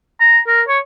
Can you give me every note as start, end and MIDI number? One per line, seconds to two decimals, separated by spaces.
0.20 0.39 82
0.47 0.62 70
0.68 0.79 73